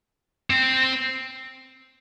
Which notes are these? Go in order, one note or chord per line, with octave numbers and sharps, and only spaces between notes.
C4